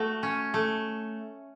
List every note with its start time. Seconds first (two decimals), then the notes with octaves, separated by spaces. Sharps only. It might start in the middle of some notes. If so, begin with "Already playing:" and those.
Already playing: A3 F#4
0.23 C#4
0.54 A3